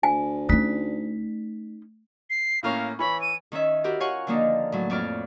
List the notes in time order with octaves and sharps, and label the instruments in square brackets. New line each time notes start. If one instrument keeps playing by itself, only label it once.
[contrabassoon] D2 [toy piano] G#5
[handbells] A3 B6 [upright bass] C#4 D#4
[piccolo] C7
[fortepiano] A2 A#3 C#4 [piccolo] F5
[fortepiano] E3 C#5 [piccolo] B5
[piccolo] D#7
[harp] D#3 C#4 C#5 E5
E4 F#4 G4 A#4
F4 C#5 F5 F#5 G#5 C#6
D3 D#3 F3 A#3 D4 D#4
A2 F#3
F2 C#5 D5 D6 F6